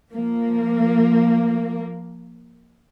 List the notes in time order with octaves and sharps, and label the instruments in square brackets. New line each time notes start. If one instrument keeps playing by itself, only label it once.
[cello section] F3 A#3